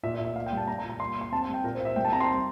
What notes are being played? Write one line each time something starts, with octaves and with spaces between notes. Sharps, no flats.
A#2 E5
E5
A#2
E5
A#3 F5
G5
G3
A5
G3 A#5
A#5
A#2
A#5
A#3 C6
A#3
C6
C4 A5
A5
G3
G5
A#2 A#4
C5
A#2
E5
C2 G5
A5
C4 A#5
C6